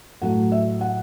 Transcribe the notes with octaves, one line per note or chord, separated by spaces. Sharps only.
A2 F#3 A3 F#5
E5
F#5